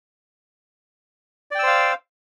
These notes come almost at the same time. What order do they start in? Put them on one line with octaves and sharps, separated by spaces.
D5 G5 E6 C5 F5